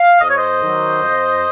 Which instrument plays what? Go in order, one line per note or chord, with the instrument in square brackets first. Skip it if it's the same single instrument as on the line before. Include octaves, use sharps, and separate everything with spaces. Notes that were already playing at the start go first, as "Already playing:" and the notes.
Already playing: [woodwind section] F5
F2 D#5
C#5
C5 D#5
D#3 F#3
F2